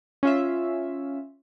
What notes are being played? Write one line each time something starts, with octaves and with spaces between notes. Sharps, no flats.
C#4 F4 E5